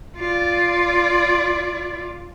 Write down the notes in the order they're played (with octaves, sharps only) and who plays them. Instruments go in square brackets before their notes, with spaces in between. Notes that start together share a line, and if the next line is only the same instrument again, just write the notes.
[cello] F4 D5